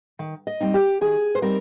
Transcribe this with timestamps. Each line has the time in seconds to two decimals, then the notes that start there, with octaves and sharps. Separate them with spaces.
0.19 D#3
0.47 D#5
0.60 G3 C4 D#4
0.74 G4
1.01 D#3 G#4
1.35 C5
1.42 G3 C4 D#4 A#4